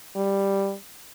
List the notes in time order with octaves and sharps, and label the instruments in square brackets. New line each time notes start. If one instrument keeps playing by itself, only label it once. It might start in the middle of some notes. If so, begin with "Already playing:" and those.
[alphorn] G3